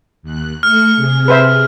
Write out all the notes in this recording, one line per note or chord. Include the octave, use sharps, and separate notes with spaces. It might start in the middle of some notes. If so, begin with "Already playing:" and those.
D#2 F#6
A3 F6 C#7
C3 G#4
B4 C5 E5